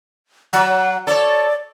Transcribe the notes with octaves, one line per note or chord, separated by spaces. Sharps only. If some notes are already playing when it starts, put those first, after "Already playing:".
F#3 F#5
A4 C#5 D5